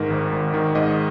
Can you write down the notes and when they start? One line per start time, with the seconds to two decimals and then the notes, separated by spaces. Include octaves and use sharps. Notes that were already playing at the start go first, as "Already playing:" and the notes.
Already playing: G#2 D#3 A#4
0.10 G#1
0.32 G#1
0.54 D#3
0.75 G#2 D#5